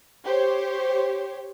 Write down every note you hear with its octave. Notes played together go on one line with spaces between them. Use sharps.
G4 C5 C#5